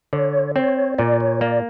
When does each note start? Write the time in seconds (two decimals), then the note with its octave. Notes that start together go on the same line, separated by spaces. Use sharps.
0.13 D3 C#5
0.56 C4 C#5
0.98 A#2 D5
1.20 C#5
1.41 A#3 D5